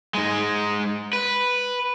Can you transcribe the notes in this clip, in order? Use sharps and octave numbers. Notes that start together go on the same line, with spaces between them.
G#2 G#3
B4